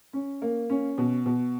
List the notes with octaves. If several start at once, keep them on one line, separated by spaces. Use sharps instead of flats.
C#4
A#3
C#4
B2
B2